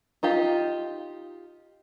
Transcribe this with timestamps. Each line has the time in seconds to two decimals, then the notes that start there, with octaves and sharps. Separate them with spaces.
0.23 D#4 F4 G4